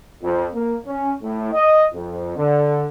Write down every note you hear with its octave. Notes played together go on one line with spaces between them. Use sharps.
F2
A#3
C#4
A2
D#5
F2
D3